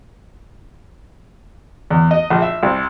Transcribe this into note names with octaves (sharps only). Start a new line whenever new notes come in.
E2
D#5
A#1
E5
C2